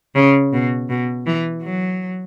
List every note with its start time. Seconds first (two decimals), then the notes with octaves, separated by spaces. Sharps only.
0.15 C#3
0.53 B2
0.89 B2
1.26 E3
1.63 F#3